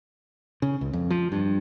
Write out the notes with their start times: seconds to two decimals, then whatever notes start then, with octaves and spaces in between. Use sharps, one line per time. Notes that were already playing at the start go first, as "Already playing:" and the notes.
0.62 C#3
0.81 C#2
0.93 F2
1.10 F3
1.32 G2